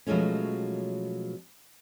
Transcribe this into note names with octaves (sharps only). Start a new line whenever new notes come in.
B2 F3 F#3 G#3 A3 C#4